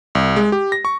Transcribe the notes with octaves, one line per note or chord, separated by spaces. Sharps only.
C2
G#3
G4
A#6
C#6